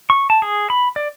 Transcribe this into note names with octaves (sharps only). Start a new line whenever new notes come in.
C#6
A5
G#4
B5
D5